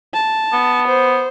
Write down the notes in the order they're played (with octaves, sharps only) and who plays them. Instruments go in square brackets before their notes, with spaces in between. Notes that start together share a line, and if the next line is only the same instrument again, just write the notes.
[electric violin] A5
[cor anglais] B3
[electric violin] C5